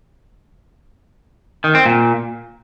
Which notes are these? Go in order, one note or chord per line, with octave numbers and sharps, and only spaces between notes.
D#3
C4
A#2